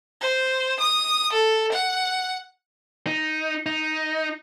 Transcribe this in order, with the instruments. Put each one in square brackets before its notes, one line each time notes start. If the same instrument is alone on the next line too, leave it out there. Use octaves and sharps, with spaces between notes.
[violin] C5
D#6
A4
F#5
[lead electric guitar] D#4
D#4